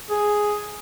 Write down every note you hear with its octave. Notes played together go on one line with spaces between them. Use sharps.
G#4